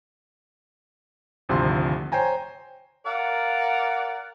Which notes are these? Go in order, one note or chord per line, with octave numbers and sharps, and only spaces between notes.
G#1 D2 C3 F3 C6
C5 C#5 G5 G#5 A#5
A#4 D5 F5 F#5